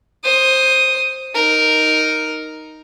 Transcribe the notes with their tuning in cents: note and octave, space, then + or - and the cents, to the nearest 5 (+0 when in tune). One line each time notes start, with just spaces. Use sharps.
C5 +10 D#6 +0
D#4 +0 A#4 +0